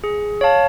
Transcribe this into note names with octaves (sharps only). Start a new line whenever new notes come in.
G#4
C#5 F5 A5